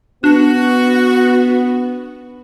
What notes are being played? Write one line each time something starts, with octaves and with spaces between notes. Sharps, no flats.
B3 D4 F#4